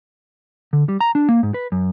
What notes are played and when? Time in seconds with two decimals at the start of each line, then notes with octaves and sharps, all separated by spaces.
0.73 D3
0.89 G3
1.01 A#5
1.15 D4
1.29 A#3
1.43 G#2
1.54 B4
1.72 F#2